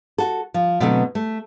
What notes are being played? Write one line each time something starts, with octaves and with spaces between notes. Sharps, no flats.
F#4 A4
F3
B2 D3 F#3 A3 B3 C4
A3